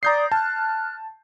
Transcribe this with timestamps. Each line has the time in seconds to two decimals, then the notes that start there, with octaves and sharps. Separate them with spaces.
0.03 D5 A#5 D#6 G6 C7
0.32 A5 F6 F#6